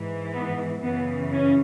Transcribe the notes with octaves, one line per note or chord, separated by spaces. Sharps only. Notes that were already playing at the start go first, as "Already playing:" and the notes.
Already playing: G#2 E3
B3
F#2 C#3 E3 B3
C#4